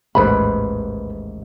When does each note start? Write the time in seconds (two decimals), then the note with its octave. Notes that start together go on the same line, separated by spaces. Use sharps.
0.15 A1 D#2 G#2 B4 C5 B5